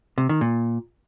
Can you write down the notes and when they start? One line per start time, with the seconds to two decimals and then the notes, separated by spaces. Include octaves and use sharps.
0.18 C3
0.29 D#3
0.41 A#2